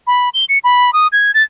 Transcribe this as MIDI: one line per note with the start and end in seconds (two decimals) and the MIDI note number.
0.07 0.29 83
0.34 0.45 103
0.49 0.58 97
0.64 0.93 83
0.93 1.07 87
1.12 1.31 92
1.34 1.43 93